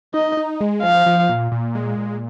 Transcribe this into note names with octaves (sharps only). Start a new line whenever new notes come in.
D#4 D#5
D#4
G#3
F3 F5
F3
A#2
A#2
G#3
A#2